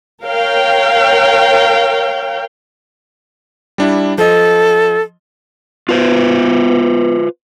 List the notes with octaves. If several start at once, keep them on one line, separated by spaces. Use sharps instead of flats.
A#4 C#5 F5 G5
G3 D4 E4
F3 A4 D#5
B3 F4 B4 C5